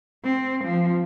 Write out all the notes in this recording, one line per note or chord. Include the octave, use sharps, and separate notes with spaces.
C4
F3